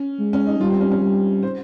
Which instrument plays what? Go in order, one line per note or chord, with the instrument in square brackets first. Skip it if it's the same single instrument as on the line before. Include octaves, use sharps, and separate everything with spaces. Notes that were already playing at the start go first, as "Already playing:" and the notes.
Already playing: [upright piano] C#4
[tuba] G#3
[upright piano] C#4
D#4
[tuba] G3 [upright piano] F4
[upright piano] C4
C#4
C#4
[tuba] G3
[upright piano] C5